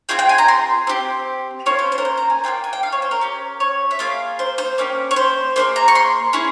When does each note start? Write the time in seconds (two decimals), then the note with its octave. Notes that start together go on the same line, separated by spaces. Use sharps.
0.09 C4 F4 G#4 G5
0.19 G5
0.29 G#5
0.38 A#5
0.48 C6
0.87 C4 G4
1.66 A#3 C#4 F4 C#5
1.79 C5
1.92 C5
1.98 A#4
2.05 C5
2.17 A#5
2.30 G#5
2.44 A#3 C#4 F4 G5
2.64 G#5
2.73 G5
2.83 F5
2.92 C#5
3.02 C5
3.11 A#4
3.21 C#4 G4
3.60 C#5
3.91 E5
3.99 A#3 F4 G#4 F5
4.39 C5
4.58 C5
4.78 A#3 C#4 G4
5.11 C#5
5.16 C5
5.56 A#3 E4 G#4 C5
5.76 A#5
5.88 C#6
5.95 C6
6.33 C#4 E4 G#4